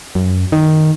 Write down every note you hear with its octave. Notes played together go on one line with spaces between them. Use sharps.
F#2
D#3